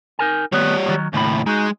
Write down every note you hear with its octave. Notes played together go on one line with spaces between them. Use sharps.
D#4 A#4 G#5
D#3 G3 A3 B3 C#5
A2 D#3 F#3
D#2 A2 C#3 B5
G#3 D#4 F#4